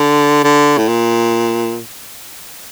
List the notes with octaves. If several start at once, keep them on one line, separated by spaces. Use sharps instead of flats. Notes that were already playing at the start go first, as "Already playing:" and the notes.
Already playing: D3
D3
A2
A#2